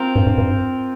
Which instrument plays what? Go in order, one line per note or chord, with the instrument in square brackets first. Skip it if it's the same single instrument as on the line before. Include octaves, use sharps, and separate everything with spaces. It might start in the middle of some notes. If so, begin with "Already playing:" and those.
Already playing: [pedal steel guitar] C4 F4 A#4
[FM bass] G2
G2
G2